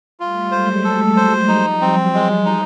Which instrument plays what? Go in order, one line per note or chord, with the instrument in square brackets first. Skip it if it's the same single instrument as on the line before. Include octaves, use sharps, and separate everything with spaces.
[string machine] G3 A3 [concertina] F4
[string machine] F#3 G#3 [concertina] C5
[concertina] A4
C5
[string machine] F3 G3 [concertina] D#4
[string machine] F#3 [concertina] C4
[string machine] F3 [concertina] G#3
[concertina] D#4